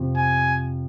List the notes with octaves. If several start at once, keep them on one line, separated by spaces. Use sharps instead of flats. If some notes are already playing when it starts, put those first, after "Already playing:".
Already playing: F2 C3 F3
G#5